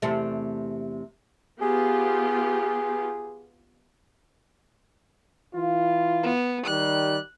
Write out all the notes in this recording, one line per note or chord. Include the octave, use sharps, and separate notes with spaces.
E2 C3 A3
B3 F4 G4 G#4
E3 F4
B3
D#3 G3 F#6